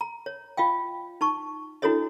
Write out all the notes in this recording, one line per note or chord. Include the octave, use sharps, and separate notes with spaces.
A#5
C#5
F4 D#5 F5 G5
D#4 A5 C#6
D4 E4 F#4 A4 C#5 D#5